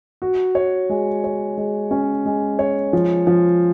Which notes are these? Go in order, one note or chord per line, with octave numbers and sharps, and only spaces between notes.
F#4
C#5
G#3
C#5
G#3
C#4
G#3
C#5
F3
F3